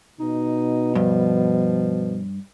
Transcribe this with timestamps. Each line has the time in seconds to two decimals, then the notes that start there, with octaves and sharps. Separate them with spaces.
0.20 B2 D#4
0.95 G2 F3